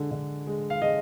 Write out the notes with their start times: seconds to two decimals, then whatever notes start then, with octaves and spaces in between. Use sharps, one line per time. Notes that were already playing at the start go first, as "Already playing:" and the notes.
Already playing: D3 G#3
0.11 D3
0.47 G#3
0.70 F5
0.81 G#3 D#5